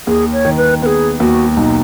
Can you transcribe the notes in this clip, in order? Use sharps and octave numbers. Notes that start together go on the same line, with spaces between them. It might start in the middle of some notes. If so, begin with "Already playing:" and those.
D#2 G#4
C#5
D#3
B4
B3 G#4 B4
D#2 F#4
B1 D#4